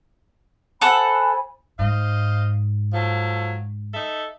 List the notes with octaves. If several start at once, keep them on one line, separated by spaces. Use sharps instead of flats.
A4 C5 F#5 G#5 B5 E6
G#2 C5 D#5 F5
F3 F#3 A4
D#4 A4 E5